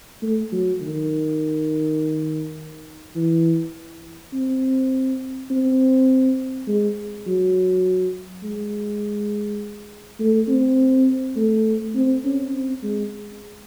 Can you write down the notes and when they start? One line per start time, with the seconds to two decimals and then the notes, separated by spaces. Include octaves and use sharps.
0.23 A3
0.52 F#3
0.81 D#3
3.15 E3
4.33 C4
5.50 C4
6.68 G#3
7.26 F#3
8.43 G#3
10.20 A3
10.48 C4
11.36 A3
11.95 C4
12.25 C#4
12.54 C4
12.83 G#3